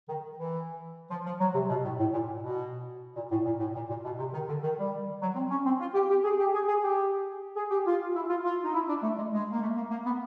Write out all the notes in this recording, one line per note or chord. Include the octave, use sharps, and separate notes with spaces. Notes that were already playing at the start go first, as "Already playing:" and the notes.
D#3
E3
F3
F3
F#3
C3
B2
A2
A2
A#2
B2
A#2
A2
A#2
A2
A#2
A#2
B2
C3
D#3
D3
D#3
G3
F#3
C4
C#4
C4
F4
G4
G4
G#4
G4
G#4
G#4
G4
G#4
G4
F4
E4
F4
F4
D#4
E4
D4
A3
G#3
G#3
A#3
A3
A#3
A#3
B3